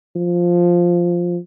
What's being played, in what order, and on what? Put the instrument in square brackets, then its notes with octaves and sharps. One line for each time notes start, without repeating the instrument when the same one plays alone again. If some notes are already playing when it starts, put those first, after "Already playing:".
[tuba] F3